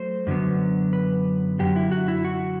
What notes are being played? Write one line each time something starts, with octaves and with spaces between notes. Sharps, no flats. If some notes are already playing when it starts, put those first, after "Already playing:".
Already playing: F#3 A3 C5
F#2 D3 F#3 B3
B4
F#2 D3 F#3 G4
E4
F#4
E4
F#4